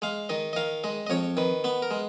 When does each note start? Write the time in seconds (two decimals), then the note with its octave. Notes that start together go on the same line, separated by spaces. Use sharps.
0.02 G#3 F5
0.29 D#3 D#5
0.53 D#5
0.56 D#3 F5
0.84 G#3 D#5
1.07 D#5
1.10 F2 C#5
1.37 D#3 B4
1.64 B3 B4
1.82 A#4
1.91 G#3